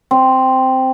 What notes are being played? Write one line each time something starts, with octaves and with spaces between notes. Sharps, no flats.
C4